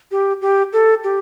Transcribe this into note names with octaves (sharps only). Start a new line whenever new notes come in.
G4
G4
A4
G4